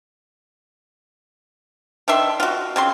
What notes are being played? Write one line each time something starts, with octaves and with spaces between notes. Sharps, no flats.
D#3 D4 E5 C6
F4 F#4
C#3 C4 C6